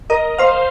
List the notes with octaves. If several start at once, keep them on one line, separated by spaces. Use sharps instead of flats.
A#4 D#5
C5 F5